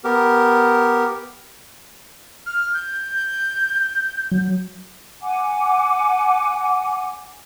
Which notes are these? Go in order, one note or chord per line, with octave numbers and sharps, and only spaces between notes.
B3 G4 A#4
F6
G6
F#3
F#5 G#5 D6